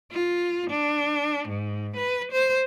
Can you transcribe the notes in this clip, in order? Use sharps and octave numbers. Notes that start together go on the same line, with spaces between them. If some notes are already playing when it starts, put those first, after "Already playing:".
F4
D4
G#2
B4
C5